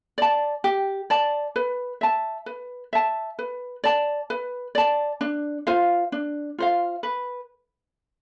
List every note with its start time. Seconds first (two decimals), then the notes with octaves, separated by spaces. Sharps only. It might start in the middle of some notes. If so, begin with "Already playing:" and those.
0.18 D5 A5
0.64 G4
1.10 D5 A5
1.56 B4
2.01 E5 A5
2.46 B4
2.93 E5 A5
3.39 B4
3.84 D5 A5
4.30 B4
4.75 D5 A5
5.21 D4
5.67 F4 C5 F5
6.12 D4
6.58 F4 C5 F5
7.03 B4